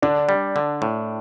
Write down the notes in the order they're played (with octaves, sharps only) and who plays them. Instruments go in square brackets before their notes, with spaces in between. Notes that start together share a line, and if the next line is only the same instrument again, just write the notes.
[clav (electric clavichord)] D3 [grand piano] D4
[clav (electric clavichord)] G3
D3
A2